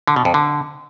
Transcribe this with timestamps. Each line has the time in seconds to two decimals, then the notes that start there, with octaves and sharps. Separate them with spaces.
0.07 D3
0.16 B2
0.25 F2
0.34 D3